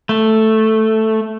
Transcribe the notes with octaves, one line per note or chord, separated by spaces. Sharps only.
A3